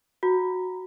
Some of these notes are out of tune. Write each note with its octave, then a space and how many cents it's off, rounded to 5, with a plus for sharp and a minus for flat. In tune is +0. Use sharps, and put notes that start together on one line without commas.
F#4 -10 A#5 +0